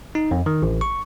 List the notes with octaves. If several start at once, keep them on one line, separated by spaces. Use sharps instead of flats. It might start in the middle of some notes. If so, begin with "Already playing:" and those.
D#4
F2
D#3
A1
C#6